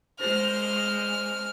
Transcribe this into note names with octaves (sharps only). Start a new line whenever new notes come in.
G#3 C5 F6